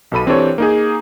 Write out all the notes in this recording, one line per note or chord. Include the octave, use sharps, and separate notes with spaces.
B1 B2 A4 B5 D#7
E3 C4 D4 G4 A4 C#5
A#3 D#4 G#4